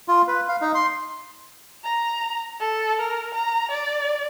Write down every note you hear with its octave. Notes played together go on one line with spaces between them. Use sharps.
F4
B4
F5
D#4
C6
A#5
A4
A#4
A#5
D5